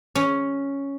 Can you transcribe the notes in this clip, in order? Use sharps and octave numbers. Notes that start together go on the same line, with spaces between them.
C#4